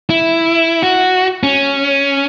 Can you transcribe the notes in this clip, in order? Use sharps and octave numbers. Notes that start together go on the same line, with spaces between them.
E4
F#4
C#4